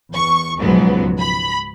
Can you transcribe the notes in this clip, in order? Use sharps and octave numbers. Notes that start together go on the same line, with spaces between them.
E2 C#6
C#2 G#2 B2 F3 F#3 B3
B5